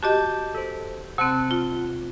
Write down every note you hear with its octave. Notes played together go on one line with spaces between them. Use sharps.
F#4 G4 D#5 A5 D6 G6
A4 C5
C3 C4 F#5 A5 F#6
F4